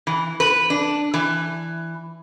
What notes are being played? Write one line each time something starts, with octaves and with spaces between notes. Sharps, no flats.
E3
B4
D4
E3